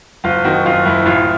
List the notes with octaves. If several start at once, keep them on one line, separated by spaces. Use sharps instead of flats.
F#1 F4
D#3 F#4
F#2 F4
F#1 E4
A1 F4